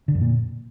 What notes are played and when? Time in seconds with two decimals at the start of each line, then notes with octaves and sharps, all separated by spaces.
0.08 D3
0.15 F2
0.21 A#2